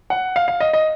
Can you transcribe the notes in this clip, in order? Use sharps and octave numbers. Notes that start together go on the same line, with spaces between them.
F#5
F5
F5
D#5
D#5